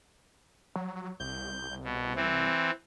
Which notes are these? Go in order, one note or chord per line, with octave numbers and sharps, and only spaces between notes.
F#3
C2 G6
B2
E3 C4